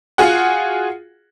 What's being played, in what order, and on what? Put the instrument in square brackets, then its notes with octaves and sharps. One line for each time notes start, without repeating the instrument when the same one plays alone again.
[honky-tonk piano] F4 F#4 G#4 F#5